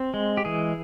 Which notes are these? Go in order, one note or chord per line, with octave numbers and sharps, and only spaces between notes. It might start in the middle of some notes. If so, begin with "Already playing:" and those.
Already playing: C4
G#3
G4
E3 G#4